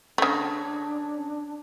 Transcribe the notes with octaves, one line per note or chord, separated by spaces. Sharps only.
C#3 A3 C#4 D4 C#5 A#5